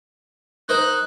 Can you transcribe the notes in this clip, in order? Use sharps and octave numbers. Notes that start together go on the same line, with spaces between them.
D#4 A#4 C5 F#6